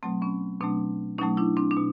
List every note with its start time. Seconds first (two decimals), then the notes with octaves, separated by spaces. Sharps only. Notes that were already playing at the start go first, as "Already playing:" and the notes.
0.03 B2 F#3 A3 C4
0.22 B3 C#4
0.61 B2 F#3 A3 C4 D4
1.18 B2 F#3 A3 C#4 D#4
1.37 D4 E4
1.57 C4 D4
1.71 D4
1.77 B2